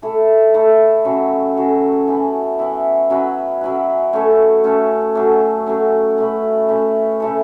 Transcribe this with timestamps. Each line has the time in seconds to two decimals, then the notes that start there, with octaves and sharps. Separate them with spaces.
0.02 A3 E4 A4
0.54 A3 E4 A4
1.05 C#3 F#3 C#4 A4
1.56 C#3 F#3 C#4 A4
2.07 E3 B3 E4
2.59 E3 B3 E4
3.10 F#3 C#4 E4 B4
3.61 F#3 C#4 E4 B4
4.13 A3 C#4 A4 C#5
4.64 A3 C#4 A4 C#5
5.15 F#3 A3 C#4
5.66 F#3 A3 C#4
6.18 A3 C#4 E4 B4
6.69 A3 C#4 E4 B4
7.20 C#3 A3 E4 A4